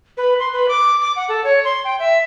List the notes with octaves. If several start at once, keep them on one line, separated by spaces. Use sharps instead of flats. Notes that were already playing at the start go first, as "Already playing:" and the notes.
B4
C6
B4
D6
D6
F#5
A4
C#5
C6
G5
E5